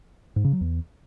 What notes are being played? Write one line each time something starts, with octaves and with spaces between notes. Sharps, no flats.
G#2
C#3
F#3
E2